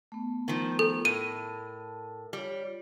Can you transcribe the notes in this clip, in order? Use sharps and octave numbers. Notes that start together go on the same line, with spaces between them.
A3 B3
D#3 F3
A4
A2 A#4 A5 D#7
G3 F4 C#5